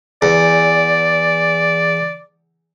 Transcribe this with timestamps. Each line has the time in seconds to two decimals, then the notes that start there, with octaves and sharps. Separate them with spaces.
0.22 E2 D5